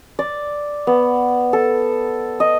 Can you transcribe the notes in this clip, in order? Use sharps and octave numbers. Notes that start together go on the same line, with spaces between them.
D5
B3
A4
D#5